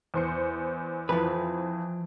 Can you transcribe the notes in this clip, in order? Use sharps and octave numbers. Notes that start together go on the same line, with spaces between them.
E2 C5 C#7
F2 E3 F3 B4